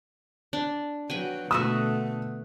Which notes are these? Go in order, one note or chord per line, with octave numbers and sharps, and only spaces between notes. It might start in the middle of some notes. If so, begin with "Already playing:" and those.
D4
F#3 F#4 B4 G5 G#5
B2 D3 A3 F#4 B4 E5 D#6